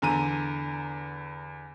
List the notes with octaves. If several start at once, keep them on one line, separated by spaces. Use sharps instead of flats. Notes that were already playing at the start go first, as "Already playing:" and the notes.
E2 D3 A#5 D#7